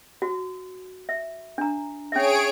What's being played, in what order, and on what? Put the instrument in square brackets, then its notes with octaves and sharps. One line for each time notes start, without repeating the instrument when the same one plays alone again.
[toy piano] F#4
E5
D4 A#5
[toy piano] C#4 E5 [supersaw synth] G#4 C#5 D7